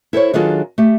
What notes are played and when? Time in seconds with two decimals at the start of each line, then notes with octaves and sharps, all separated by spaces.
0.13 E4 A4 C5 C#5
0.34 D#3 F#3 D4 F4 G#4 A4
0.78 A3 G4